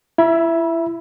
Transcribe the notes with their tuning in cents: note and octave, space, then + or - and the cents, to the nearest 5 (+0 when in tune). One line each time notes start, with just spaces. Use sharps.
E4 +25 E5 +5 B5 -35